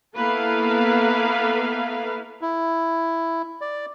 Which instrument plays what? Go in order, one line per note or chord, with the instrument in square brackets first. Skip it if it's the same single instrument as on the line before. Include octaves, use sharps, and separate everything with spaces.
[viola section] A#3 B3 E4 A4 B4 F5
[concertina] E4
D5